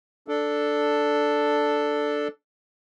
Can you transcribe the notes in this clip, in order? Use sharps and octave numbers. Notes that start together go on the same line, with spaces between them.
D4 A4